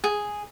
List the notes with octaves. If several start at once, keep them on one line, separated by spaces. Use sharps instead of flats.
G#4